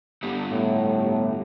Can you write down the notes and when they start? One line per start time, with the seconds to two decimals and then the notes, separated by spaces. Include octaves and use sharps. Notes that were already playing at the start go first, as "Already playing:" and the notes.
0.23 G2 D3 G3 B3
0.51 A2